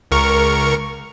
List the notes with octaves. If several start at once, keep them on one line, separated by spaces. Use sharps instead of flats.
C#2 A#4 C#6